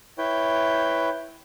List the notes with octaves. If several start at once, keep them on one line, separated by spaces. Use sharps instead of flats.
E4 B4 C#5 G5